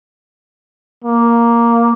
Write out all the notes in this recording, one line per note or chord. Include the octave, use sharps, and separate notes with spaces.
A#3